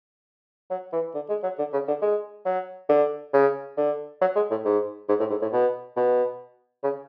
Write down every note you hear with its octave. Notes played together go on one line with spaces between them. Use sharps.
F#3
E3
D3
G#3
F#3
D3
C#3
D3
G#3
F#3
D3
C#3
D3
F#3
G#3
A2
G#2
G#2
A2
G#2
A2
B2
B2
C#3